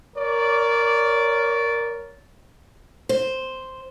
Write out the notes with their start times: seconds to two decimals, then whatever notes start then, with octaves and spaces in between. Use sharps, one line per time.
0.16 A#4 C#5 D5
3.09 C5